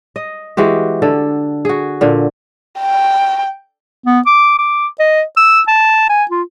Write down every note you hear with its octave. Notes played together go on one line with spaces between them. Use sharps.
D#5
E3 G#3 F#4 G4
D3 A4
F#4 G#4
A#2 D3
G5
B3
D6
D6
D#5
E6
A5
G#5
F4